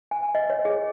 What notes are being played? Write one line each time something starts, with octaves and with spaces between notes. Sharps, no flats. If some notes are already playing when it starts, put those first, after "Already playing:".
G#5
D#5
C#5
G#4